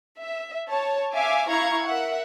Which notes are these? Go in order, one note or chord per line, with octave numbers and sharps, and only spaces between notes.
E5
C#5 A5
E5 F5 G#5 D6
E4 F5 A#5 C#6 G#6
A#4 E5 F#5